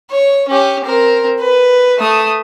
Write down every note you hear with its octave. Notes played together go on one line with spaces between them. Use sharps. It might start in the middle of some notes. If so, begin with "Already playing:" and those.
C#5
C#4 G4
C4 A#4
B4
A3 D#6